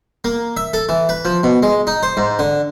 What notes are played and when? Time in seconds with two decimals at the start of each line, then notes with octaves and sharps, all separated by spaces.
0.24 A#3
0.57 E5
0.73 A4
0.89 E3
1.09 B4
1.25 F3
1.43 B2
1.63 G#3
1.87 D#4
2.03 C5
2.17 G#2
2.39 D3